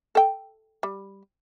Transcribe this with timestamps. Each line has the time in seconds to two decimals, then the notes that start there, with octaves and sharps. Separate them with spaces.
0.15 A4 G5
0.83 G3